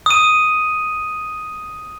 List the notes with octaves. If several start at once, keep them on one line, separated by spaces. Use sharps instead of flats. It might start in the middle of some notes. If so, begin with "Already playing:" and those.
D#6 D#7